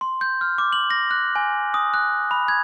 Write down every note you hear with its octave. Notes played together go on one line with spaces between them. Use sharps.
C6
G6
F6
D6
F#7
A#6
F#6
G#5
D#6
F#6
B5
G#6